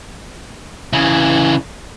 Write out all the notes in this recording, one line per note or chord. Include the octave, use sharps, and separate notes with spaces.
C#3 E3